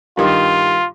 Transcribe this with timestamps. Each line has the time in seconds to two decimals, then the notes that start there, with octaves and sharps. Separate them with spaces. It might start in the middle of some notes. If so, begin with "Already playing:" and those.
0.17 G2 D#3 G3 F4